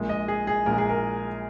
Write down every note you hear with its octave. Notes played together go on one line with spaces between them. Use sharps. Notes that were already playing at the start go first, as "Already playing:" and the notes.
Already playing: A#1 A#2 G#3
D#5
G#4
G#4
A#1 A#2 G#3 A#4
G#4
A#4